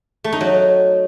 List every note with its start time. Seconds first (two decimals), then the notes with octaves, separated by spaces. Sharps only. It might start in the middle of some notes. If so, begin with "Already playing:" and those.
0.24 A3
0.33 D#4
0.41 F#3